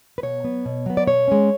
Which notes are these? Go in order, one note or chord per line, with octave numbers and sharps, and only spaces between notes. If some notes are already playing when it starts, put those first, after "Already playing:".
B4
B2 C#5
F#3 B3
B2
F#3 B3
D5
B2 C#5
G#3 C#4